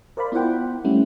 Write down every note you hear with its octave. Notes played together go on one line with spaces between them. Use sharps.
A#4 C5 D5 F5 B5
B3 E4 F4 C5 F#5 G5
G3 A3 C#4 E4